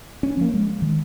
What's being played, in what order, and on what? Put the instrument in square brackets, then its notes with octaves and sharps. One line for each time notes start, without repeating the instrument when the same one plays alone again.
[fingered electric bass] C#4
F3 A#3
G#3
D#3